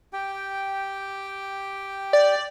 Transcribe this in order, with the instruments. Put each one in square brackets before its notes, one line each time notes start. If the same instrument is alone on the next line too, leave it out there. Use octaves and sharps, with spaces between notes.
[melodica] G4 G5
[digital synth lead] D5